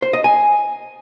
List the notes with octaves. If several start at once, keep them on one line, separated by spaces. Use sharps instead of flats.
C5
D#5
G#5